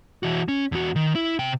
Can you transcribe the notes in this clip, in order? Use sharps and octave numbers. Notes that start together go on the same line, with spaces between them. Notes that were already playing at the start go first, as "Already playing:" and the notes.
E3 F#4
C#4
E2 F#4
D#3
E4
C3 G5